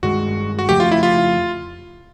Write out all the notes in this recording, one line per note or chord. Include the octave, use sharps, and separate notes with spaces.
G2 D#3 G#3 F#4
F#4
F2 C#3 F3 A3 G4
F4
E4
F4